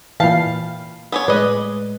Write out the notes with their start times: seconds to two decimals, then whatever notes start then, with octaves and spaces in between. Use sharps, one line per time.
0.20 A#2 E3 F5 G5 A5 B5
1.12 B3 B4 C#5 G#5 D6
1.28 A2 G#3 B4 D5 D#5